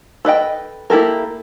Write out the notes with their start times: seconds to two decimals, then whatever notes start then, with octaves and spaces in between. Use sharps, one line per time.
0.25 A4 B4 D#5 G5
0.90 A#3 E4 G4 A4 A#4